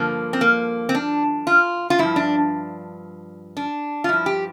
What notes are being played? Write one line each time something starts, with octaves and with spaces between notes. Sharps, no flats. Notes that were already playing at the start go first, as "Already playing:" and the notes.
Already playing: G2 D3 F3 A#3
C4
A#3
C4
D4
F4
F4
G2 F3 E4
D4
D4
F4
G2 F3 E4
G4